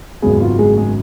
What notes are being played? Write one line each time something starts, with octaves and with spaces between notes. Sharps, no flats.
G#1 F#2 C#3 F#3 G#3 B3 G#4
F4
G#3 G#4
G#3 G#4